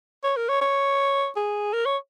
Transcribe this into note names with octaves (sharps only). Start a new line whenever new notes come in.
C#5
A#4
C#5
C#5
G#4
A#4
C#5